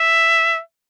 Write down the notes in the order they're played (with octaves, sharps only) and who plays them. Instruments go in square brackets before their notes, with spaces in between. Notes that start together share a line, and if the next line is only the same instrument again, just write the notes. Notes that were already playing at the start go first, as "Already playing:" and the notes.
Already playing: [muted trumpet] E5